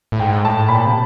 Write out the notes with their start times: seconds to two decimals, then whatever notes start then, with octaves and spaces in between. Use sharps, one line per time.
0.12 A2
0.20 G#2 G5
0.45 A2 A5
0.69 A#2 B5
0.86 C3